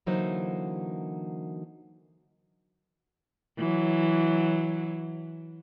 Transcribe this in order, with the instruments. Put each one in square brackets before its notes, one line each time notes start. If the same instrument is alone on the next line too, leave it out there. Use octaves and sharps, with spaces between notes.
[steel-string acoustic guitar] D3 E3 F#3 A#3 D#4 C5
[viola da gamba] E3 F#3